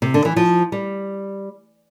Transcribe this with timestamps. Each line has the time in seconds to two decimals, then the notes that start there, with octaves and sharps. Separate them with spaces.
0.02 C3
0.14 D3
0.25 E3
0.36 F3
0.72 G3